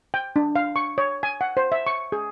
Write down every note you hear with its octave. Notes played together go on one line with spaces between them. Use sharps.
G5
D4
F5
C#6
C#5
G#5
F#5
C5
E5
C#6
G#4